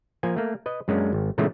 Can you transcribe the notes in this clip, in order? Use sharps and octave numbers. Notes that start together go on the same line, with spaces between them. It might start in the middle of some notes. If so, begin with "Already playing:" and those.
F3 A#3 G#5
A3 A#3
B4 D#5
F#2 G#3 A#3 C#4 D4
G#1
A#2 C#3 E3 G#3 A3 B3